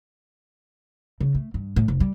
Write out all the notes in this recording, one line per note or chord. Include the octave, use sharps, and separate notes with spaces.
C#3
A3
G2
A2
F1
G3